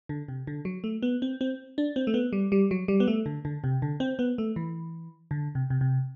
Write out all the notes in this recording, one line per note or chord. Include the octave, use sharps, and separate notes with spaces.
D3
C3
D3
F#3
A3
B3
C4
C4
D4
C4
A3
B3
G3
G3
F#3
G3
B3
A3
D3
D3
C3
D3
C4
B3
A3
E3
D3
C3
C3
C3